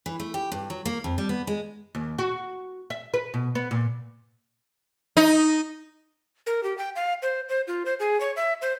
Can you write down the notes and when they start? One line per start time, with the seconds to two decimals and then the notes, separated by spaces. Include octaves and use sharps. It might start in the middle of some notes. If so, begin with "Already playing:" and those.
0.06 E3
0.20 A3
0.34 G4
0.52 G2
0.70 F#3
0.85 A#3
1.04 F2
1.18 G3
1.29 B3
1.47 G#3
1.95 D#2
2.18 F#4
2.90 E5
3.14 B4
3.34 B2
3.55 B3
3.71 A#2
5.17 D#4
6.47 A#4
6.63 G4
6.78 G5
6.96 F5
7.22 C5
7.49 C5
7.67 F4
7.86 C5
8.00 G#4
8.21 C#5
8.36 E5
8.62 C5